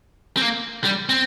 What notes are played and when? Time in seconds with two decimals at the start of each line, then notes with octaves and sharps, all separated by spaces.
0.37 C4
0.42 A#3
0.84 G3
1.09 C4